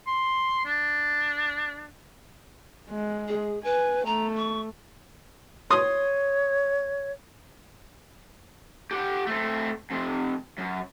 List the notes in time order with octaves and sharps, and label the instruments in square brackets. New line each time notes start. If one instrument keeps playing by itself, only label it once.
[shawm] C6
D4
[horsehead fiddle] G#3
[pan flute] G#4
[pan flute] B4 [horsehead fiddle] G#5
[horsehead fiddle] A3 [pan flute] A#5
[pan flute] C#6
[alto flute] C#5 [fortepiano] C6 D#6
[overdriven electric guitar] G4 F#5
A3 C4
F2 C3
F#2